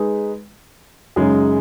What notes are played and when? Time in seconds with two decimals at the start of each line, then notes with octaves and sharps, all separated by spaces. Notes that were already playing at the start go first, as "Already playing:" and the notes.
Already playing: G#3 D#4 G#4 B4
1.16 F#2 C#3 G#3 D#4 G#4